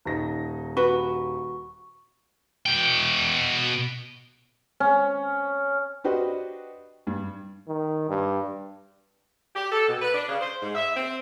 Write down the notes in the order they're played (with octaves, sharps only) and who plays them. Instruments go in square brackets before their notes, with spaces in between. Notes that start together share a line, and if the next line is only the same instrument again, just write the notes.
[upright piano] D#1 D#4 A#6
[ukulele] F#4 B4 [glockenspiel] C#6
[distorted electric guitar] B2 G5
[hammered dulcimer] C#4
[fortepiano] D4 F#4 G4 B4 C5 D#5
G2
[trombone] D#3
G2
[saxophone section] G4
A4
B2
B4
D4
C#3
C5
G#2
E5
C4